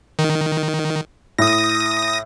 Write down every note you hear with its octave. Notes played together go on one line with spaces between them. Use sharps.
D#3
A2 D#6 A#6